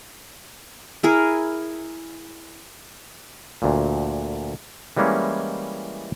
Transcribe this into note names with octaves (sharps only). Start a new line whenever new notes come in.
E4 G#4 A#4
D2 A#2
E3 G3 G#3 A#3 C#4 E4